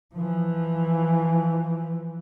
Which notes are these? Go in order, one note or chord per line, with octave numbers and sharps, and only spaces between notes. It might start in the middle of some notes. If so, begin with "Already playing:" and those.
E3 F3